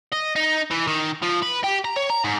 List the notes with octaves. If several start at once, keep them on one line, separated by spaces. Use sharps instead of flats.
D#5
D#4
E3
D#3
F3
B4
G4
A#5
C#5
A#5
G#2